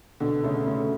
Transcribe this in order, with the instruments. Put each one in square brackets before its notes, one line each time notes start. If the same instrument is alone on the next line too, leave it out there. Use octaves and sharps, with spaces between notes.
[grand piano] B2 [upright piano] D3
[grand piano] C#3 [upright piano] A3
[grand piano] C#3 [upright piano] A3